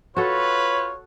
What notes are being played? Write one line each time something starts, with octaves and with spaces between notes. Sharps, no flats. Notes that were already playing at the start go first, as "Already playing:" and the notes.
F4 F#4 A4 B4 C#5